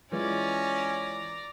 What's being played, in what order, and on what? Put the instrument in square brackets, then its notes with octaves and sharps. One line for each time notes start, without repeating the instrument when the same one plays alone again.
[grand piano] E3 G#3 F4 [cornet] C#4 [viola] D5 A#5